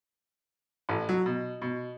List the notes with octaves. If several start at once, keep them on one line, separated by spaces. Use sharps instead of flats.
A1
F#3
B2
B2